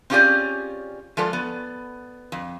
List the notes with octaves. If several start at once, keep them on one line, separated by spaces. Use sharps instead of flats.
C4 C#4 F4 G4 G#4 D5
F3 G#3 F4 A4 D5
B3
F2